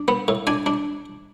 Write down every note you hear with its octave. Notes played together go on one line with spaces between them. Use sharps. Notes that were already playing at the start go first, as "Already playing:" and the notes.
Already playing: D4
B3
A2
D4 G#5
D4